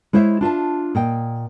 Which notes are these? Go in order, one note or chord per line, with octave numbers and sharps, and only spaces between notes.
G#3 E4 C5 C#5 E5
D4 F4 E5 A5
A#2 D#5 G5